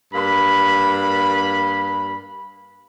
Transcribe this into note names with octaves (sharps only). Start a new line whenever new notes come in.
G2 A#3 B5